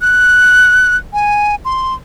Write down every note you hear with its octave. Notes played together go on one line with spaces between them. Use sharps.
F#6
G#5
C6